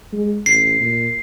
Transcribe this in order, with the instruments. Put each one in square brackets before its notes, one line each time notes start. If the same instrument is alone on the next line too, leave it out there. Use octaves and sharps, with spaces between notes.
[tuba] G#3
[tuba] A1 [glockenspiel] C7
[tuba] A#2